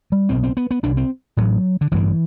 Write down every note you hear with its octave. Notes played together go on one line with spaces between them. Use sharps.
G3
B1 B2 C4
C4
B3
B3
C2 C3 D4
C4
A1 A2 F#3
D3
A1 G2 D3 E3